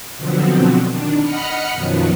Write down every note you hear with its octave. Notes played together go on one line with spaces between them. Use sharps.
B2 D3 F3 F#3 B3 C4
D#3 D4
D#5 F#5 B5 F6 C#7
F#2 B2 D#3 F3 F#3